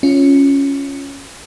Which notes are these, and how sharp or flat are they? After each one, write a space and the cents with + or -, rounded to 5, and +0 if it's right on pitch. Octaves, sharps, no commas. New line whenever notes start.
C#4 +0 F4 +0